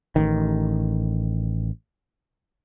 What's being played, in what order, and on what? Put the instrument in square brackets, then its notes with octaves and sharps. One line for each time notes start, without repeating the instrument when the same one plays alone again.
[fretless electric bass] A1 D#3